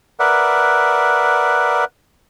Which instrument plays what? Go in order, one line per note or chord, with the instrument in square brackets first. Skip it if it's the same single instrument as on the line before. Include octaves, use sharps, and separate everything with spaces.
[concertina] A#4 B4 D5 E5 F#5